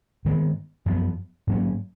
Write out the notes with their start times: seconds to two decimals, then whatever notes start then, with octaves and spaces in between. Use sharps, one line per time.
0.25 G#2 D#3 G#3 B3
0.86 F#2 F3 B3
1.47 G#2 F#3 A#3 C#4